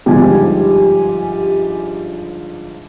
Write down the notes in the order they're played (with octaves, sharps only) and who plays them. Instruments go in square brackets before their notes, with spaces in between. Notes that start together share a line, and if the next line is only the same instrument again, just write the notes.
[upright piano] G1 G#2 F3 [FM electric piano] G4 G#5